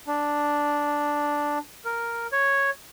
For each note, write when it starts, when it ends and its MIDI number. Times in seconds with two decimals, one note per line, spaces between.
0.07 1.58 62
1.85 2.27 70
2.32 2.70 73